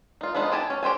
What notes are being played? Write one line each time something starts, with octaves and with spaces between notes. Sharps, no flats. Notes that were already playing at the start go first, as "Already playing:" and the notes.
D#4 F4
F3 G#3 B3 D#4 F4
G4 G#5 A5
C#4
G4 C5 G5 G#5